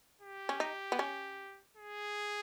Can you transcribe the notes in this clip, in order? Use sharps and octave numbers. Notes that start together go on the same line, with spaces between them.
G4
C#4
D#4
B3
C#4
G#4